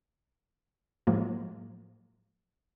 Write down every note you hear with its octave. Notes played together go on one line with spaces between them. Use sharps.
A2 F3 F#3 G#3 A#3